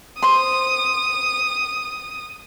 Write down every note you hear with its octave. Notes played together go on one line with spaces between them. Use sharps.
C5 C6 D#6